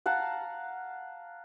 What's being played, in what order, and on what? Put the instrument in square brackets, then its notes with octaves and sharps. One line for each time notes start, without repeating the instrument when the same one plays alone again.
[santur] F5 F#5 A5 A#5